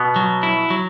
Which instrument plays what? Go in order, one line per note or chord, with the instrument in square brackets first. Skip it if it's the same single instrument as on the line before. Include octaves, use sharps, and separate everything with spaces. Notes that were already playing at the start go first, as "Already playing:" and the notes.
Already playing: [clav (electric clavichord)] B2 B3
[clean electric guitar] F#3
E4
F#3